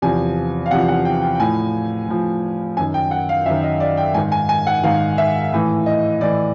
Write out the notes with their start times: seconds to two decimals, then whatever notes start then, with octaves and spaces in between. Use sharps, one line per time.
0.02 E2 C3 F3 G#5
0.66 F5
0.71 E2 C3 F3 F#5
0.88 F#5
1.05 G5
1.22 G5
1.35 G5
1.40 A2 F3 G#5
2.08 A2 F3
2.77 F#2 G#5
2.80 D#3
2.94 G5
3.11 F#5
3.29 F5
3.46 F#2 D#3 E5
3.63 D#5
3.80 D5
3.97 G5
4.14 G#2 D#3 G#5
4.32 G#5
4.49 G#5
4.67 F#5
4.84 G#2 D#3 F5
5.18 E5
5.53 A2 E3
5.86 D#5
6.21 A2 E3 D5